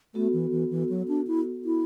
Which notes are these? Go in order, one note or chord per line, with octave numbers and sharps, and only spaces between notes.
A3 B3 F#4 A4
E3
E3
E3
F#3
D4
E4
E4